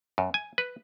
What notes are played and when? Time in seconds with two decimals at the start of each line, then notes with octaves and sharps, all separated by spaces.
0.18 F#2
0.34 G#5
0.58 B4